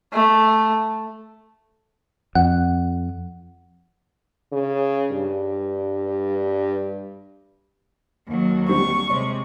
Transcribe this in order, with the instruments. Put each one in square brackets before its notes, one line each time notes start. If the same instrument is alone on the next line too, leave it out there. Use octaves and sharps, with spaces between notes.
[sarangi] A3
[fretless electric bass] F2 [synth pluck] F#5
[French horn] C#3
G2
[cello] D#2 F#3
[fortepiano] D3 G3 C4 [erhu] C#6
[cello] C3 G#3 [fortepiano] C#5